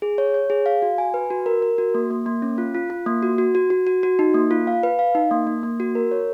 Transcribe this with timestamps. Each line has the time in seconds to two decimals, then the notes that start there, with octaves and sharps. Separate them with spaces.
0.02 G#4
0.18 C#5
0.34 C#5
0.50 G#4
0.66 F5
0.82 F#4
0.98 G#5
1.14 B4
1.30 F#4
1.46 A#4
1.62 A#4
1.78 F#4
1.95 A#3
2.11 A#3
2.26 A#3
2.42 C#4
2.58 F4
2.74 F4
2.90 F4
3.06 A#3
3.23 F#4
3.38 F#4
3.55 F#4
3.70 F#4
3.87 F#4
4.03 F#4
4.19 D#4
4.34 A#3
4.51 F4
4.67 F5
4.83 B4
4.99 F5
5.15 D#4
5.31 A#3
5.47 A#3
5.63 A#3
5.80 F#4
5.95 A#4
6.11 C#5